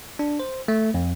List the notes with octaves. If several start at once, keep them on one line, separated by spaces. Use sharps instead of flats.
D4
C5
A3
F2